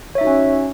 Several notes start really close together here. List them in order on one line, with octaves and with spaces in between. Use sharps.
C#5 E5 D#4 F#4 C#4